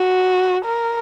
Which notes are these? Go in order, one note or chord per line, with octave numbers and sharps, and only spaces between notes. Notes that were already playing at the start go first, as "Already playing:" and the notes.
Already playing: F#4
A#4